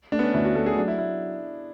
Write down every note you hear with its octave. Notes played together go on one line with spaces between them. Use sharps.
A3 D4
B3
C#4
D2 E4
F#4
A3 A4
G#4
F#3 D4
E4
E4